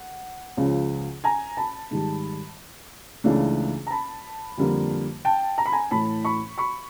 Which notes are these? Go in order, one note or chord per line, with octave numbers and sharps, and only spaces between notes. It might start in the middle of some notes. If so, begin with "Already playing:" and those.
Already playing: F#5
C#2 C#3 F3
G#5 A#5
A5 B5
G#2 D#3 G3
C#2 C#3 E3 A3 D4
A#5
A5 B5
F2 D3 G3 A#3
G5 A5
A#5
B5
G#5 A#5
A2 E3 A3 A5 B5
B5 C#6
B5 C#6